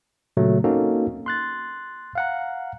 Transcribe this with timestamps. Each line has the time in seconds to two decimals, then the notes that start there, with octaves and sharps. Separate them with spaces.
0.37 A#2 C#3 F#3 A3
0.64 A#3 C4 C#4 D#4 F#4 A4
1.26 C6 F#6 A6
2.15 F5 F#5 A#5